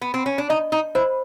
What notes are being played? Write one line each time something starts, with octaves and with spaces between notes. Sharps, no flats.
B3
C4
C#4
D4
D#4 D#5
D#4
E4 C5